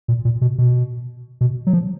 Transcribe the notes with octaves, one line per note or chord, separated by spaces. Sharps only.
A#2
A#2
B2
B2
B2
F#3
F3